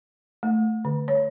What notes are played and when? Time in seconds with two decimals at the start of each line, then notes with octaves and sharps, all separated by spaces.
0.43 A3
0.85 D3
1.08 C#5